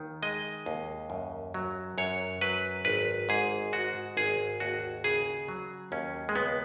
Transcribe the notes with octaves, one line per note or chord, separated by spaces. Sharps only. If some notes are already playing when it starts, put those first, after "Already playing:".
Already playing: D#2 D#3
G#3 D#5
D#2
F#2
F#3
F#2 C#5
F#3 B4
G#1 B4
G#2 G#4
G#3 F#4
G#1 G#4
D#2 F#4
C#3 G#4
F#3
D#2 C#4
G#3
C#2 B3